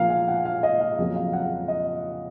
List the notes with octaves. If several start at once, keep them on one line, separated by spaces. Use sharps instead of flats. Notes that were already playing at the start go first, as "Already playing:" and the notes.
Already playing: A#2 F3 A#3 F5 G#5
F5
F#5
F5
D#5
F5
F2 C#3 F#3 A#3
F5
F#5
D#5